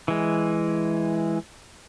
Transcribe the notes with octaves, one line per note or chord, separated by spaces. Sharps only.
E3 G#3